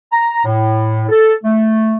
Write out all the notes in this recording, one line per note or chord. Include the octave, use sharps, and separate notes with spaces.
A#5
A2
A4
A3